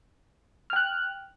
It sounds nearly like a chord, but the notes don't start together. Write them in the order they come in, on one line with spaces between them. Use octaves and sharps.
F6 G5 F#6